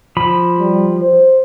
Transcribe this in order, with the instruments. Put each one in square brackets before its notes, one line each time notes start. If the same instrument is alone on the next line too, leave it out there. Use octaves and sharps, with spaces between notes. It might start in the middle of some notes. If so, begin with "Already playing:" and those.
[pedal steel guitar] F3 B5
[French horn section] G3
C5